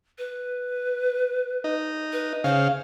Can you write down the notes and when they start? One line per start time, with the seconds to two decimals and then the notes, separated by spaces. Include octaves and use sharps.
0.18 B4
1.64 D#4
2.13 B4
2.44 C#3 C5 F5